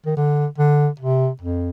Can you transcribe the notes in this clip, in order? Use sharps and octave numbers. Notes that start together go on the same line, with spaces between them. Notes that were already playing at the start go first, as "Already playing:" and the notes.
D#3
D3
D3
C3
F2